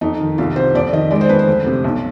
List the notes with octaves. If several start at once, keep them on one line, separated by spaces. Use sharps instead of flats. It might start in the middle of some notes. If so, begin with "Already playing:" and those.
F2 D#4
D#3
C2 F4
C3 C5
F2 D5
D#3 D#5
G#3 D5
C5
F2 B4
C5
D2
C3
B1